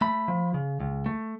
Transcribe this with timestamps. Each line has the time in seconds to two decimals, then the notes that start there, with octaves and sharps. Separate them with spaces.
0.01 A3 B5
0.28 F3
0.54 C#3
0.80 C#2
1.06 A3